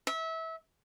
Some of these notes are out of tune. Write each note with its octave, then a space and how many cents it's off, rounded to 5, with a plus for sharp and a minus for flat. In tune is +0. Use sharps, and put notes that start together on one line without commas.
E5 -25